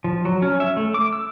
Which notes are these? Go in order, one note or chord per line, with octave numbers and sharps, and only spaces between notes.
F3
F#3
C#4
E5
A3
D6
E6